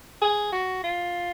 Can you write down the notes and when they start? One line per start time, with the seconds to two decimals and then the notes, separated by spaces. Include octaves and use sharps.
0.22 G#4
0.52 F#4
0.84 F4